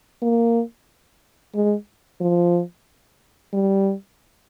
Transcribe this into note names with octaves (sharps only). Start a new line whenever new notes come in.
A#3
G#3
F3
G3